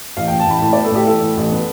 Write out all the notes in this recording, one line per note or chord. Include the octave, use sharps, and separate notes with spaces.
A1 F5
G5
A1
A5
A1 B5
A2 A5
D5
B3
A4
A2 G4
E3 A4
A2
A1
B3